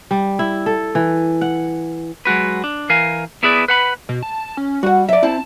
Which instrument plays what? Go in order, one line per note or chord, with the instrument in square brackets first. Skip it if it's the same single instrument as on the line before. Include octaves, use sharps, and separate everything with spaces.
[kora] G3
E4
A4
E3
F#5
[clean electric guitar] F#3 G#3 F#4 B4
D4
E3 A#4 F5 G#5
B3 E4 G#4 B4 D5
B4 F#5 B5
[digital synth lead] B2
A5
C#4
[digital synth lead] G3 [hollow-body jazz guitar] F#4 F#5
[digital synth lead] F#3 [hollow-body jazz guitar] D5 E5
[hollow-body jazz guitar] C4 E4 [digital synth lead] A5